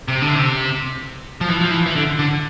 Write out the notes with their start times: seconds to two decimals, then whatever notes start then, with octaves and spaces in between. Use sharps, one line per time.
0.08 C3
0.22 D3
0.35 C3
1.41 F3
1.49 E3
1.61 F3
1.71 E3
1.86 E3
1.96 D3
2.19 D3